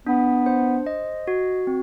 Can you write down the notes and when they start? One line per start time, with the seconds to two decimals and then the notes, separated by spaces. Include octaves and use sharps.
0.07 B3 D4
0.46 C5
0.86 D#5
1.27 F#4
1.67 C4